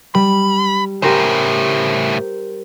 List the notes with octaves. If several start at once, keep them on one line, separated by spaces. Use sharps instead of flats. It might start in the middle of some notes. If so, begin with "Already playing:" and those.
G3 B5
A2 C#3 G4 A#4 C5